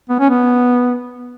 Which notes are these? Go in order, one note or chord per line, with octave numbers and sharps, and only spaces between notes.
B3
C#4
B3